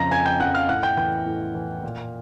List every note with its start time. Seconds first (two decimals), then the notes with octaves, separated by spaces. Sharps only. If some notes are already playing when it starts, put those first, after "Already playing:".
Already playing: F2 C#3 F3 A#5 A#6
0.11 F2 G#5 G#6
0.25 G5 G6
0.40 C#3 F3 F#5 F#6
0.55 F5 F6
0.69 A2 F#5 F#6
0.83 G5 G6
0.97 E3 G5 G6
1.26 A2
1.55 E3
1.83 A#2